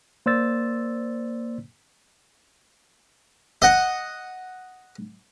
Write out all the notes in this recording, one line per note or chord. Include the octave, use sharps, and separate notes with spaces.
A#3 C5 D5 E6 A6
D#5 F#5